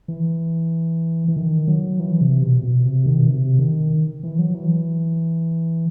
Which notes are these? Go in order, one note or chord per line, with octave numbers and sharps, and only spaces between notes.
E3
E3
D#3
F#3
E3
C3
B2
B2
C3
D#3
B2
C3
D#3
E3
F#3
E3